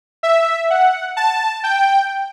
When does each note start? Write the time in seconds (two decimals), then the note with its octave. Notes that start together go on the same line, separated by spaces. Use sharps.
0.23 E5
0.70 F#5
1.17 A5
1.64 G5